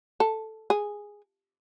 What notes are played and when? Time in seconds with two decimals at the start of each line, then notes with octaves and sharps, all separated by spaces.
0.20 A4
0.70 G#4